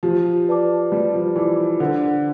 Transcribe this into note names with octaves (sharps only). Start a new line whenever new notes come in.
F3 G4
B4 D5 A5 D6
G3 G4
F3
E3 B4 D5 A5 D6
D3 C5